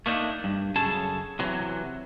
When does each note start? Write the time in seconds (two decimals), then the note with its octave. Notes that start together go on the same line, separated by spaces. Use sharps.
0.06 A3 A#3 D4 D#4
0.44 G2
0.76 F#2 C#3 G#4 A4 A5
1.39 C3 E3 F#3